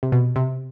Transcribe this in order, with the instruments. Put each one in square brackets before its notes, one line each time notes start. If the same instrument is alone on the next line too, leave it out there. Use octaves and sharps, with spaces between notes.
[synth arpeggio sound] C3
B2
C3